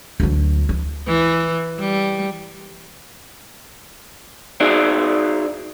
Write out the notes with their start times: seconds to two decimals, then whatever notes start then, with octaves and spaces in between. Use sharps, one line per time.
0.20 D2 F#3
0.69 E3
1.07 E3
1.79 G3
4.60 D#4 F#4 G#4 D5 E5